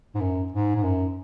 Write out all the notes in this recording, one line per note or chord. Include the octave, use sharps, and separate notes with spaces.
G#2
F#2
G#2
G#2
F#2